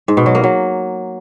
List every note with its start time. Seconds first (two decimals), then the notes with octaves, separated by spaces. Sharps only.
0.08 G#2
0.17 B2
0.26 F#3
0.35 A#3
0.44 F#3